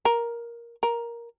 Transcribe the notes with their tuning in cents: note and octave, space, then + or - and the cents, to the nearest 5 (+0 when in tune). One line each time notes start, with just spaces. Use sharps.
A#4 +10
A#4 +10